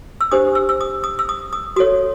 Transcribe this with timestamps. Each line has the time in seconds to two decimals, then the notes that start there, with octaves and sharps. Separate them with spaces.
0.21 E6
0.31 D4 G4 C5 D#6
0.55 E6
0.69 E6
0.81 D#6
1.04 D#6
1.19 E6
1.29 D#6
1.53 D#6
1.76 F#4 A4 C#5 D#6